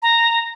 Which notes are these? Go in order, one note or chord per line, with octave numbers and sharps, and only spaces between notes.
A#5